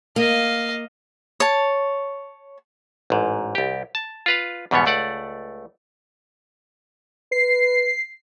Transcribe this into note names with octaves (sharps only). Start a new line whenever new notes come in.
A#3 D#5 F5
C#5 A5
A1 G#2
C2 G4
A5
F4 B4 F5
E2 G#2 B2 G3 B3 C#5
C#2 A3 D5 F#5
B4 C7